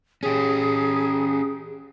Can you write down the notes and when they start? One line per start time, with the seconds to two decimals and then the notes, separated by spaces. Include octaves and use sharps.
0.23 C#4 G4 G#4